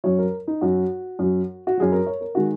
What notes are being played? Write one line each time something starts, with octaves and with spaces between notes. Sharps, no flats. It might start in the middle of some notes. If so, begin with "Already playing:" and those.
F#2 F#3 C#5
A#4
D#4
F#2 F#3 F#4
F#2 F#3
F#4
F#2 F#3 G#4
A#4
C#5
A#4
D#3 G#3 F#4